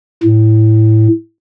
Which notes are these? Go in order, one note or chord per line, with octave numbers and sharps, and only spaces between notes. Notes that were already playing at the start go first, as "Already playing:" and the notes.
A2